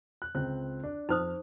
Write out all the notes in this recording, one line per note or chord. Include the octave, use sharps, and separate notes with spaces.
F#6
C#2 C4 F#6
D4
F2 D#4 C5 D#6 F6